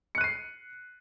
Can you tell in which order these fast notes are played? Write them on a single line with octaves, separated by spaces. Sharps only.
C#7 F#6 D#7 C7